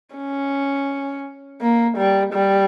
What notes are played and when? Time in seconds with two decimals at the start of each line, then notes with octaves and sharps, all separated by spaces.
0.15 C#4
1.61 A#3
1.97 G3
2.34 G3